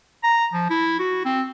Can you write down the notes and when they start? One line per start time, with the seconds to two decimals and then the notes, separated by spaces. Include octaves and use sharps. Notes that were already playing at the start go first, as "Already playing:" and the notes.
0.23 A#5
0.53 F3
0.70 E4
0.99 F#4
1.25 C4